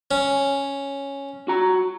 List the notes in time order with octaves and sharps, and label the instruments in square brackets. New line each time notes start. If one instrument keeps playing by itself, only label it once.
[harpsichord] C#4
[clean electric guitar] F#4 A#5